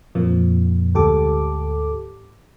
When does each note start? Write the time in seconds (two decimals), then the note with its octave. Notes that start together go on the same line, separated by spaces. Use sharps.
0.15 F2 A#2 F3 A#3
0.94 D2 G#2 G4 A4 D6